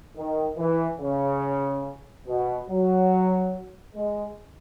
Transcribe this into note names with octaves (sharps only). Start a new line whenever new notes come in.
D#3
E3
C#3
B2
F#3
G#3